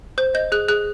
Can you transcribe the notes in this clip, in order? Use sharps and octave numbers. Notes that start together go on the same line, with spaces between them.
C5 G6
D#5 G6
G#4 F#6
G#4 F#6